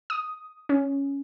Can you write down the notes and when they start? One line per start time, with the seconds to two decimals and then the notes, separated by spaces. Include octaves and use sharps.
0.10 D#6
0.69 C#4